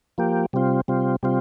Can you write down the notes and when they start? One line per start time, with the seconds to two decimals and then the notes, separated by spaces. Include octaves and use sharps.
0.18 F3 A#3 G4
0.53 C3 G3 C4 F4
0.88 C3 G3 C4 F4
1.23 C3 G3 C4 F4